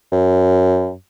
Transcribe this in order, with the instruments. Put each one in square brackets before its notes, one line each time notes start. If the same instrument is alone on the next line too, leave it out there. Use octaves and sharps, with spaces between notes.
[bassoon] F#2